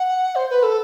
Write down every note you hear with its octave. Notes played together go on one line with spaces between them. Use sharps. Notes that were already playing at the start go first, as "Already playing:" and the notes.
Already playing: F#5
C5
B4
A4